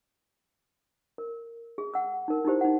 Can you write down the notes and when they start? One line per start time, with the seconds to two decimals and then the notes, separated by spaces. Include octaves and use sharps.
1.18 A#4
1.78 G#4
1.94 F#5 E6
2.28 D#4 A#4
2.45 D#4 E4 G4 C5
2.61 D#4 F#5